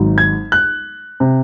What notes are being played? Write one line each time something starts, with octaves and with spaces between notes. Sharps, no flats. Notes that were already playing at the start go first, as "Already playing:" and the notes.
Already playing: G#1 G#2 F#3
G#6
F#6
C3